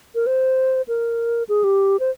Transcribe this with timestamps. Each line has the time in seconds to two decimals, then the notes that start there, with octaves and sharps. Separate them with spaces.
0.15 A#4
0.27 C5
0.88 A#4
1.49 G#4
1.64 G4
2.00 C5